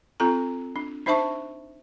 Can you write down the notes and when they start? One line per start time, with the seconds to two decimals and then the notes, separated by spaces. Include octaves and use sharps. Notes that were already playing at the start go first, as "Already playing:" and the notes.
0.20 C4 F4 A4 A#5
0.76 D4
1.06 D4 D#4 C5 E5 A5 C#6